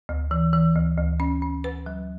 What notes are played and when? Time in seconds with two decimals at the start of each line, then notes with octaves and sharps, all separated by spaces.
0.09 D2
0.31 E3
0.53 E3
0.76 D2
0.98 D2
1.20 C#4
1.42 C#4
1.64 B4
1.86 F#3